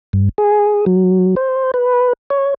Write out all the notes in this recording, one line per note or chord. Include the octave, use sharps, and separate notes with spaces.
G2
G#4
F#3
C5
B4
C#5